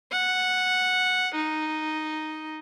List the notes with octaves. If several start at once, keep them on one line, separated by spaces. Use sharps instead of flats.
F#5
D#4